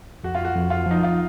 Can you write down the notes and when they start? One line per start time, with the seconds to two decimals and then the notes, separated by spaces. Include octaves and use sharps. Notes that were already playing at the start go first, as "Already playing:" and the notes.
0.24 F2 F#4
0.35 F4
0.45 F#4
0.56 F2
0.70 F4
0.86 F3 D#4
1.03 F4